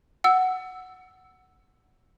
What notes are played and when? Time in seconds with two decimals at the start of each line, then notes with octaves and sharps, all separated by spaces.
0.24 F#5 E6